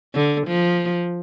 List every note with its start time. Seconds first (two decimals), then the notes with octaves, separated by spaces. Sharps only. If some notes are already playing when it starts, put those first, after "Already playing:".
0.15 D3
0.47 F3